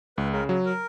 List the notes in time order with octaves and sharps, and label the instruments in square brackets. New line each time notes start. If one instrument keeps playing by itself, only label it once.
[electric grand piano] C#2 [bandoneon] B4
[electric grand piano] C#3 [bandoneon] A#4
[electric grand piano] F#3
[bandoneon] A#4